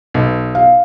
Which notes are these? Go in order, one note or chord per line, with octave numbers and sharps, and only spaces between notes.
B1
F5